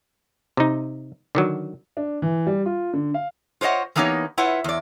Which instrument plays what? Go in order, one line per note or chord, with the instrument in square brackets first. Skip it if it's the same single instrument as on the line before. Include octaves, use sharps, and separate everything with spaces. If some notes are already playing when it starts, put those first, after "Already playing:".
[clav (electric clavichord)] C3 D#4
D3 D#3 F#3
[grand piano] D4
E3
G3
F4
D3
F5
[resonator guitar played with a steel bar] F4 C5 C#5 D#5 F#5
E3 A#3 B3 D#4 G4 C#5
E4 F4 B4 C#5 F#5
E2 D5